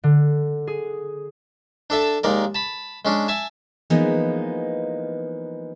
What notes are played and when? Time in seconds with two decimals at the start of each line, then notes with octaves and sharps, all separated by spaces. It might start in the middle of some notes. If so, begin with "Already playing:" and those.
0.04 D3
0.67 G#4
1.90 D4 A4 E5 A5
2.24 D#2 G#3 A#4 D5
2.55 A5 B5
3.05 G#3 C#4 D4
3.28 E5 G#5 A5
3.90 E3 F3 G#3 A#3 B3 D#4